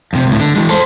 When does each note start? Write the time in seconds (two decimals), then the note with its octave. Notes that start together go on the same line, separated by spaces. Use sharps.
0.13 F2 C3
0.27 C#2 A2
0.40 D3
0.56 E3 G#3
0.69 A4 C5